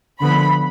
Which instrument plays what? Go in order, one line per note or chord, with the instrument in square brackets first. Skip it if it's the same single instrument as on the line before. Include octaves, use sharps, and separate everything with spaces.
[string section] D3 F3 B3 B5